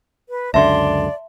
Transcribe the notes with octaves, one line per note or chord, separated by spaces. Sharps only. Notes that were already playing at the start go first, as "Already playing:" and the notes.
B4
C#2 F#2 D3 D5 E5 A5 C6